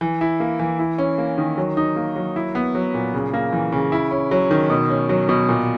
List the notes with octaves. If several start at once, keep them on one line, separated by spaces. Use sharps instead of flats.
E3
E4
A#3
E3
E4
C#4
A#3
D#3
F#3
D#4
A#3
F#3
E4
B3
F#3
A#2
C#3
A#3
E3
C#3
E4
C#4
F#3
D#3
B2
C#4
F#3
B2
A#2